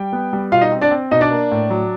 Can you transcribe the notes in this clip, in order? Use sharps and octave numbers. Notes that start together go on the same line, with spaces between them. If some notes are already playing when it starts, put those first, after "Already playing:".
Already playing: G3 G5
B3
G3
B2 F4 F5
D#4 D#5
C4
D4 D5
C4
B2 D#4 D#5
D4 D5
A#3
A2
F#3